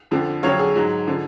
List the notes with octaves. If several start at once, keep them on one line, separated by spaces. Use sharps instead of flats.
F2 D3 F3
F2 D3 F#3 C#5 F5
G#4
G#2 F#3
D3 F3